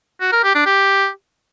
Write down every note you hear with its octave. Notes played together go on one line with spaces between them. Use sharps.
F#4
A#4
G4
D4
G4